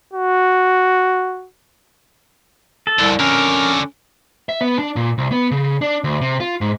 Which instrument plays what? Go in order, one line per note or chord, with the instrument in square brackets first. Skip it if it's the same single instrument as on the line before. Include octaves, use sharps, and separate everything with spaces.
[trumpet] F#4
[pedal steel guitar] A4
[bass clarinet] C2 [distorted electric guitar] F2 D3
[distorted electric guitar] F2 D3 [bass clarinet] C#4 [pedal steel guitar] A#4
[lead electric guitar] E5
B3
D4
A#2
C2
B3
C#3
D4
D2
C3
F4
G#2